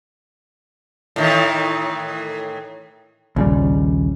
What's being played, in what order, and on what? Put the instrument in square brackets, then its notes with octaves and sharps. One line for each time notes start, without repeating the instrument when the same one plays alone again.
[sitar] A2 D#3 E3
[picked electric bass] A#1 C#3 G3 [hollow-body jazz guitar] D#2